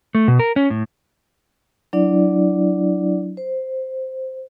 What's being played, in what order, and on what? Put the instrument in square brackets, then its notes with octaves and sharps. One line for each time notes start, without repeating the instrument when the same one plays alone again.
[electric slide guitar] A3
B2
A#4
C#4
A2
[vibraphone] F#3 D4 E4 D5
C5